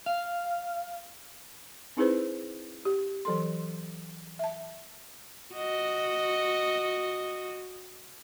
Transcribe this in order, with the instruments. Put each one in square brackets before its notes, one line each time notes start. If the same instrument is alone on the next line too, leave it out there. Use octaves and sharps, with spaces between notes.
[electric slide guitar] F5
[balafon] C4 D#4 E4 G#4 B4 C5
G4
E3 F#3 A4 C6
E5 A5
[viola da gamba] F#4 D#5